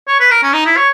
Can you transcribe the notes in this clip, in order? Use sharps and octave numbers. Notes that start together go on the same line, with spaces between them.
C#5
B4
A#4
C#4
D#4
E4
C#5